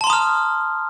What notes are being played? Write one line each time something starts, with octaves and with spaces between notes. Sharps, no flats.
A5 A#5 C6 D#6 F6